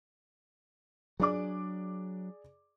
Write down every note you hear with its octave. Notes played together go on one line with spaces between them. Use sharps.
F#3 D4 G#4 D5 D6